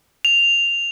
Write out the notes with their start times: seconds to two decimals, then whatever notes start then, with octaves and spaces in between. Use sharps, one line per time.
0.25 F7